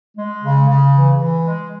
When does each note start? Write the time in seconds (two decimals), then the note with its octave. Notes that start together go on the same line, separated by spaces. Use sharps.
0.17 G#3
0.43 C#3
0.69 C#3
0.95 E3
1.20 E3
1.45 G#3